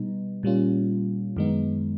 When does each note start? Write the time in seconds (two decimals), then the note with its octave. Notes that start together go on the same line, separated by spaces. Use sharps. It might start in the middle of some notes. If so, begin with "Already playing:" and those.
Already playing: B2 G3 B3 D#4
0.43 A#2 G3 A#3 C#4 F4
1.37 F#2 D#3 G#3 B3 D#4